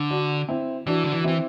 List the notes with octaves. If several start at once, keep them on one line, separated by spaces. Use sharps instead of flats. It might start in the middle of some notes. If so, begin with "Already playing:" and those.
Already playing: D3
D4 F#4
C4 E4
E3 D4 F#4
D3
E3
F#4
E3 C4 E4